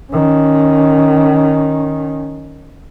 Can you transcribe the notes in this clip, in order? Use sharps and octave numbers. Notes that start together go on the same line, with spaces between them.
D#3 C#4